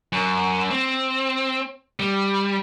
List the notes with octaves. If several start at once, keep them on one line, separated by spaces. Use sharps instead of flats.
F#2
C4
G3